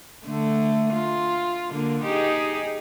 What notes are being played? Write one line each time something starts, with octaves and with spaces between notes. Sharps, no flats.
D3 A3
F4
D3 A#3
D#4 G4 G#4